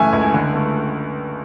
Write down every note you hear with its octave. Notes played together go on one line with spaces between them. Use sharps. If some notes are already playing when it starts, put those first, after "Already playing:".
Already playing: F#2 C#3 E3 A3 E5 G#5
C#2
D3
A3